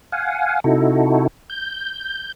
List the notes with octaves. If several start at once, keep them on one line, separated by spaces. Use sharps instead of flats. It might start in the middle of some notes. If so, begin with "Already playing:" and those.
F5 F#5 G#5
C3 D#4 E4 F#4 A4
G6